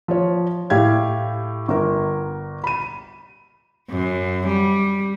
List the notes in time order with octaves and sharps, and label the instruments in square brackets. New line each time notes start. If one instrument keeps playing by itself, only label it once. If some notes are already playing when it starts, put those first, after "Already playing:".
[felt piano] F3 C#5
A2 G4 F5 G#6
G1 A#4
B5 D#7
[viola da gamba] F#2
G3